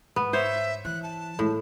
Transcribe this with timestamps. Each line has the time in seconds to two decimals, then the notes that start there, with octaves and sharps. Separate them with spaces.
0.16 G#2 B3
0.33 C5 C#5 E5
0.85 E3 F#6
1.03 A5
1.39 A2 G#3